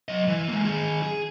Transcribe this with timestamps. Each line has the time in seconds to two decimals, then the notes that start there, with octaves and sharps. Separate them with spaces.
0.08 F#3 D#5
0.28 E3
0.49 G#3 A#3
0.65 D#3 G#4
1.03 G#4